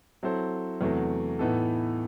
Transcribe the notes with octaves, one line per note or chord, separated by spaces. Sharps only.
F#3 C4 E4 A4 C5
E2 C3 F#3 A3
A2 E3 B3 D#4 A4